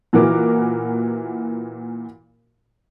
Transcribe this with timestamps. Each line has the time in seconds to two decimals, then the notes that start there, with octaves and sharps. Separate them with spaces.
0.13 A#2 E3 F#4 A#4 D6